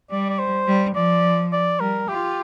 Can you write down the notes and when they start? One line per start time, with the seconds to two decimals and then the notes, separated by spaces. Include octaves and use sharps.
0.11 G3 D5
0.30 D5
0.39 C5
0.67 G3
0.95 F3 D5
1.52 D5
1.80 G3 A#4
2.09 F4 G4